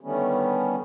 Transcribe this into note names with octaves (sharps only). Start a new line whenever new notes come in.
D3 D#3 G3 A3 B3 C#4